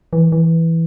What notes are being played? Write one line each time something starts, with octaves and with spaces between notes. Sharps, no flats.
E3
E3